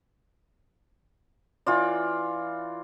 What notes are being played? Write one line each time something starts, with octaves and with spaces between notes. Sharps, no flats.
E3 F4 D5